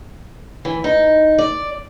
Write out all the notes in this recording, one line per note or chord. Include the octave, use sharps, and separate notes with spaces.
E3
D#4
D5